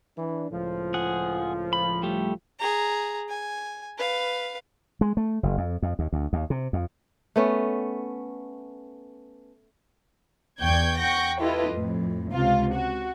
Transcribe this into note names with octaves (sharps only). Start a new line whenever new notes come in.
E3 D4
C#2 A2 F3
G#4 F#5
B5
G3 A3 G4
G#4 A#5
G#5
B4 F5
G#3
A3
F#1
F2
F2
D#2
D2
D#2
C3
F2
A3 B3 C#4
E2 D5 G5 C#6 G6 G#6
F#5 G5 C#6 G6 A#6
E4 F4 G4 A4 B4 D#5
F2 A2
C#2 C3 F4
F#4